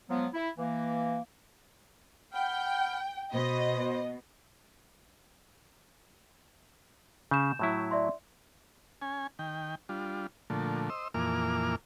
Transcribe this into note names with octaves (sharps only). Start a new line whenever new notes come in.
F3 F#3 G#3 B3
E4
E3 A#3
F#5 G5 B5 F6
B2 C5 D#5 B5
C#3 G6 E7
A2 F#3 E4
D5 E5 C6
C#4 G#5
D#3 G5
G3 D4 F4
A#2 D3 F3 A3
C5 D#5 E6
F2 A#2 E3 A#3 D6 F6